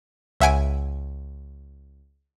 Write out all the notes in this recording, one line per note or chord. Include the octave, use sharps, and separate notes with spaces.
C#2 E5 F#5 G#5 D7